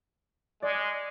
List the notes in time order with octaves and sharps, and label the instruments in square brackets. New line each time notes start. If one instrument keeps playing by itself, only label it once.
[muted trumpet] G#3 [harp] D5